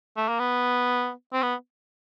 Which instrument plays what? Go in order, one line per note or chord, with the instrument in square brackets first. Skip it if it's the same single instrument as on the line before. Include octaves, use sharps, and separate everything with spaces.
[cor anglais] A3
A#3
B3
C4
B3